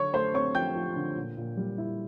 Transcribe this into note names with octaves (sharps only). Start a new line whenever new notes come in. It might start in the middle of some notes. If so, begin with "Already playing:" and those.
Already playing: D3 D4 C#5 C#6
A3 C5 C6
C4 C#5 C#6
F3 G5 G6
F3
D3
A#2
A#2
G3
E4